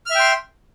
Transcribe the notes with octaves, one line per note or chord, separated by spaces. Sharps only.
E5 G5 C6 F6